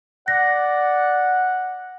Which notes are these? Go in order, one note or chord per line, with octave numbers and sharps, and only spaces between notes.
D5 F#5 A#6